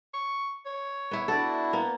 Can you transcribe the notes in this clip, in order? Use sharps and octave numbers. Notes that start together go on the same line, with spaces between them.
C#6
C#5
B3 E4
D4 E4 F#4 A4 D5
A#3 B3